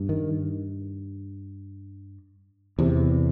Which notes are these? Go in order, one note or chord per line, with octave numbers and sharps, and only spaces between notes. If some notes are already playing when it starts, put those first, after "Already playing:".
Already playing: G2
D#3
E2 C3